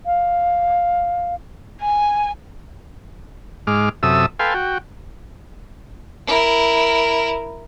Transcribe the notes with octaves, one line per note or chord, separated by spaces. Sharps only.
F5
G#5
G#2 G#3 D6 F6
F#2 C3 A4 E5 D#6 E6
A4 B4 F5 G5 G#5 C6
F#4 G5
E4 A#4